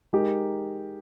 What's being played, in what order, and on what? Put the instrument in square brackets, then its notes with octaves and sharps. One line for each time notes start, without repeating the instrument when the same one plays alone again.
[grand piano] G#3 D#4 G4 A#4